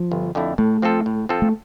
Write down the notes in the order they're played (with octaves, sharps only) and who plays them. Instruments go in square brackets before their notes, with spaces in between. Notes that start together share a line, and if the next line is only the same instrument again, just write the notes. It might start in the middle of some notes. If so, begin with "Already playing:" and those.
Already playing: [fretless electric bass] F3
[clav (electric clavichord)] G1
F2 D3 A3 E4
[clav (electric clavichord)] A2 [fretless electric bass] A3
[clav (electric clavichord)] F3 C4 F4 A4
A2
F3 C4 F4 A4
[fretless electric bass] A3